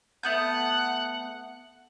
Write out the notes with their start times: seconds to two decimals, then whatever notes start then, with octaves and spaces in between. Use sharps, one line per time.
0.23 A3 B3 F#5 G6